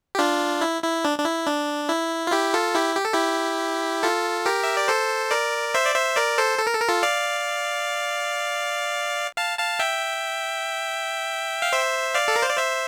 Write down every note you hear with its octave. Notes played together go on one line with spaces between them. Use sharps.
G4
D4 F4
E4
E4
D4
D4
E4
D4
E4
F4
E4 G4
F4 A4
E4 G4
G4
A4
E4 G4
F4 A4
G4 A#4
E5
D5
A4 C5
A#4 D5
C5 E5
D5
C5 E5
A#4 D5
A4 C5
A4
A#4
A4
A#4
F4 A4
D5 F5
F5 A5
F5 A5
E5 G5
F5
C5 E5
D5 F5
A4
A#4
C5
D5
C5 E5